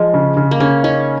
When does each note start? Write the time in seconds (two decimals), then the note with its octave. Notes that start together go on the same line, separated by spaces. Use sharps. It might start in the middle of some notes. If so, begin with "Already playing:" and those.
Already playing: F3 G#3
0.14 C#3
0.37 C#3
0.51 A#3
0.60 C#3 C#4
0.83 C#4 D#4